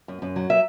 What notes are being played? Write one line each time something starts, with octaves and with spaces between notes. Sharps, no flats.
F#2
F#2
F#3
E5